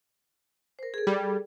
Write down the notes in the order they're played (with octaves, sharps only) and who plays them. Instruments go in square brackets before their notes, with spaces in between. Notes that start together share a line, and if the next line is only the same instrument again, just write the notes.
[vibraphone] A#4 C5
G#4 A4
[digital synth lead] G3